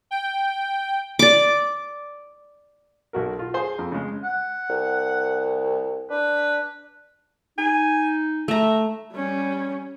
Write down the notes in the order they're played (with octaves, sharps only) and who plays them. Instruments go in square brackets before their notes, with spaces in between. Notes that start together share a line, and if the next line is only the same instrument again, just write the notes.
[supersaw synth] G5
[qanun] D5 D6
[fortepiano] B1 F#4 A#4
F4
G#4 C5 C6
F2
C#3 G#3
[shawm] F#5
[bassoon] C2
[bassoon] D4 [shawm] B4
[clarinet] D#4 [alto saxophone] G#5
[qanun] A3 A#5 [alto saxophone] E5
[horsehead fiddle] G3 C#4